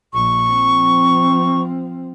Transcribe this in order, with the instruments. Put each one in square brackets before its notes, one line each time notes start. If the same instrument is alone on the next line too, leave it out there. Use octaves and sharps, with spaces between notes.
[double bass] A#1 [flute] C#6
[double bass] F3 C4